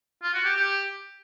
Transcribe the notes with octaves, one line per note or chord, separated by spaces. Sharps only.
F4
F#4
G4
G4